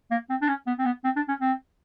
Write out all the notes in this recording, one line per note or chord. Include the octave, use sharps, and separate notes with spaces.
A#3
C4
D4
C#4
B3
C4
B3
C4
D4
C#4
C4